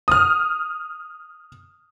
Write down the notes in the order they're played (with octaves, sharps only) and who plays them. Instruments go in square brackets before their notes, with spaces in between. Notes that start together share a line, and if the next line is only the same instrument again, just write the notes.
[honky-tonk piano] D#6 F6